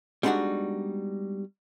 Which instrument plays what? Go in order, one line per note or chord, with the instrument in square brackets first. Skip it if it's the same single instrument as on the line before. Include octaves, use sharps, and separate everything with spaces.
[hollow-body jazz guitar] G3 G#3 B3 D4 D#4 F#4